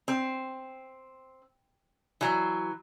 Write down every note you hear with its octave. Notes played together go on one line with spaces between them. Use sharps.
C4
E3 F#3